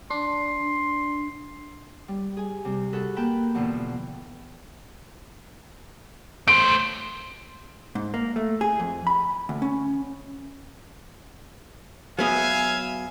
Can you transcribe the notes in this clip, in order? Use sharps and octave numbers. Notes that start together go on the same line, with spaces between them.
D4 C6
G3
G#4 G#5
C3 G3
F#4 G#4 A4 B4
A#3 B4 G5 A5 B5
E2 B2 D3 F3
A3 C5 D7
G#2
A#3
A3
G#4
F2
B5
D2
C#4
F#3 B3 G#4 E5 F5 G#5